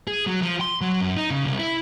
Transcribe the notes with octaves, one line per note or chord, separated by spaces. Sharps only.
G#4
F#3
F3
C6
F#3
F#2
D#4
C#3
C2
E4